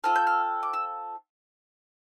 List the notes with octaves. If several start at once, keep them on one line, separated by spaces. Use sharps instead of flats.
C4 F4 A4 F6
G6
F6
D6
E6